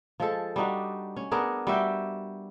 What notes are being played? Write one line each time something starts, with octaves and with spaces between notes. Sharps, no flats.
F3 G#3 A4
G3 D4 D#4 F#4
C#4
B3 D4 G#4 A#4
G3 F#4 E5 G5